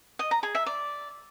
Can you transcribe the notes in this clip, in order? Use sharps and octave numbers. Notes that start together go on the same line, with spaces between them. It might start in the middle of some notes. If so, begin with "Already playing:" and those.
D#5
A#5
G#4
E5
D5